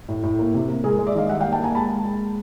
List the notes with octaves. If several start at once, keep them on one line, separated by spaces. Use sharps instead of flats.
A2
A2
A#3
C3
A#3
G#3 G#4 A#4
G#3
D5 E5
D#3 D#5 F5
G3 E5 F#5
F5 G5
A#3
G5 A5
A#3 G#5 A#5
G#3 A5 B5
G#3
G#3